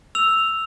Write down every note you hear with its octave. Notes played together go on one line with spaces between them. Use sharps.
E6 F7